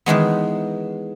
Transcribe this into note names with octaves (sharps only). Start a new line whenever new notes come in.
D#3 E3 G#3 B3